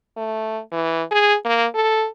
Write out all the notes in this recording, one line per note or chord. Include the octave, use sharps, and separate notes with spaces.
A3
E3
G#4
A#3
A4